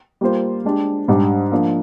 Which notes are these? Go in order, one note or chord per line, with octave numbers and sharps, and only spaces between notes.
G3 A#3 F4 C5
G#3 D4 G4
G#2 G3 D4
F3 A#3 D4